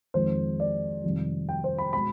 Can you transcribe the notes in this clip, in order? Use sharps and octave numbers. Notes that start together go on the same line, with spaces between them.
F2 D#3 G#3 C5
D5
F2 C3 D#3 G3
G5
C5
B5
B2 G#3 B5